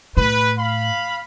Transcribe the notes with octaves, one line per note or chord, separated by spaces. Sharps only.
A2 B4
F5 B5